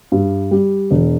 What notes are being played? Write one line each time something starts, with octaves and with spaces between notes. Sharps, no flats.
G2
G3
E1